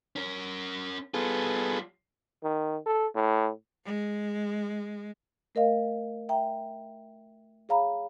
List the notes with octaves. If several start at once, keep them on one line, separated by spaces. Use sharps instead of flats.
C#4 A#4
G3 B3 F4 G#4 A4
D#3
A4
A2
G#3
A3 A#4 D#5 F5
E5 G5 A#5
G#4 C#5 F5 A#5 B5